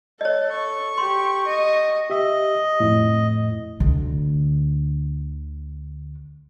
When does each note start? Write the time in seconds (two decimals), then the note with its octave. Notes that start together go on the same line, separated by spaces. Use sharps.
0.21 A4 C#5 D#5
0.49 C#6
0.97 G4 C6
1.47 D#5
2.10 G4 D#5 E5
2.80 F2 A2
3.80 D2 D3